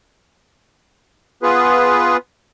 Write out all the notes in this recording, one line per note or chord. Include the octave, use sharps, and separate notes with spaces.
B3 F4 G#4 B4